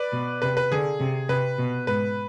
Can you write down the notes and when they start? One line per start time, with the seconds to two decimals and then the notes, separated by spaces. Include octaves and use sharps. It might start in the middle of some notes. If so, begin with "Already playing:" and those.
Already playing: B4 D5
0.12 B2
0.42 C3 B4
0.57 B4
0.71 D3 G#4
1.00 C3
1.29 C3 B4
1.58 B2
1.87 G#2 B4